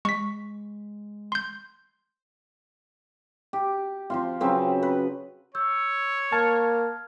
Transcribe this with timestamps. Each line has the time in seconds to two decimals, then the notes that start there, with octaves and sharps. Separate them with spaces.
0.05 G#3 C#6 B6
1.32 C6 G6
3.53 G4
4.10 F3 C4 F4
4.40 C#3 F#3 C4 B4
4.83 B4
5.55 C#5 E6 G6
6.32 A#3 A5 F6 G#6